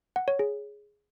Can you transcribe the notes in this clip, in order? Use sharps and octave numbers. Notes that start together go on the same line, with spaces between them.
F#5
C#5
G#4